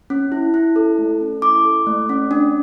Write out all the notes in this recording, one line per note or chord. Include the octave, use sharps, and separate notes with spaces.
C#4
E4
E4
A4
A3
C#4
E4 D6
A4
A3
C#4
D4